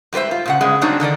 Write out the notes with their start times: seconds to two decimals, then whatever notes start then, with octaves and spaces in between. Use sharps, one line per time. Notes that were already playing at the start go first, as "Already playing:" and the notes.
0.13 G#2 G3 B4 C5 E5
0.31 F4
0.46 A#2 C#3 F#5
0.61 G2 C#3 G#3
0.81 F#3 G3 C4 D4 D#4 F#4
1.00 D3 D#3 A#4 D5